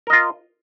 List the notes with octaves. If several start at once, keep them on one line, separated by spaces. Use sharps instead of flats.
F4 A#4 D#5